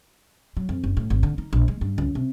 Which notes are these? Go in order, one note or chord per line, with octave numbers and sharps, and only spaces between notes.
F#3
F2
F#1
A2
G#1
D3
D#4
A#1
G#3
G2
C#2
C3